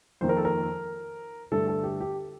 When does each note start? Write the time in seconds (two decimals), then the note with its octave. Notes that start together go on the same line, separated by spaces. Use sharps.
0.21 F2 D#3 A#3 C5
0.29 A#4
0.37 A4
0.45 A#4
1.52 G2 D3 A3 A4
1.68 A4
1.83 G4
2.01 G4